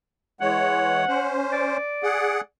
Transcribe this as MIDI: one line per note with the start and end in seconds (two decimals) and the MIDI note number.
0.41 1.05 52
0.41 1.05 56
0.41 1.05 73
0.41 1.39 78
1.08 1.77 61
1.08 1.77 72
1.53 2.41 74
2.03 2.41 68
2.03 2.41 78